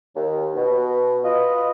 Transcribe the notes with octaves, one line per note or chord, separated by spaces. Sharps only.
D#2
B2
F4 B4 D#5